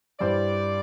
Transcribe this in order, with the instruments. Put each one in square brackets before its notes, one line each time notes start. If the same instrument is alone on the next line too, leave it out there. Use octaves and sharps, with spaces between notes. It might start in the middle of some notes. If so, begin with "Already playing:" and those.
[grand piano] G2 G3 E4 C5 [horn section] D5